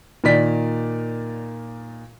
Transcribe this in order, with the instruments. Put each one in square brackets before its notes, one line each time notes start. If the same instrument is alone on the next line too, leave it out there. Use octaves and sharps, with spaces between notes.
[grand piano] A#2 D#3 D5 B6